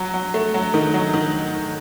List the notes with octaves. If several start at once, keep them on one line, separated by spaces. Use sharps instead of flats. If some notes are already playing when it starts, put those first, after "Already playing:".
Already playing: F#3
F#3
A3
F#3
D#3
F#3
D#3